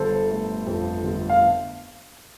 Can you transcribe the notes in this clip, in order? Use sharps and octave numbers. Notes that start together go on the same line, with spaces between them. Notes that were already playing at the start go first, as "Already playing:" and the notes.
Already playing: G1 A4 C5
A3
F2
G1
F5